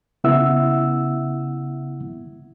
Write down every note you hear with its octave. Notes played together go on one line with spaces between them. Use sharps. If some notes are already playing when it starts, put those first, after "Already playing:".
C#3 B3 E4 E5 F#5 E6